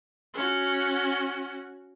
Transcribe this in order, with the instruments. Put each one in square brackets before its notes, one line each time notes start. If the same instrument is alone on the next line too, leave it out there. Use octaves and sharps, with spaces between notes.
[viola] C#4 F#4